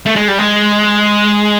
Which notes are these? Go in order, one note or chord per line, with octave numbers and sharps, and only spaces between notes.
A3
G#3
G3
G#3